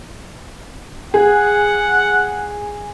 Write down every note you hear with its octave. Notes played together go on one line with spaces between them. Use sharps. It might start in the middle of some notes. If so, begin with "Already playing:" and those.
G#4 F#5